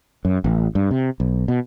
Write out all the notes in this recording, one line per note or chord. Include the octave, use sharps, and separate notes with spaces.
F#2
A1
G2
C3
B1
B2